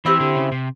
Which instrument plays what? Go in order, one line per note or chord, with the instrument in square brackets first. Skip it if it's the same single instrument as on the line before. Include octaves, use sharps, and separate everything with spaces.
[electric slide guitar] E3 [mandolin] C4 E4 G4 C5
[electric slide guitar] D3
C#3
C3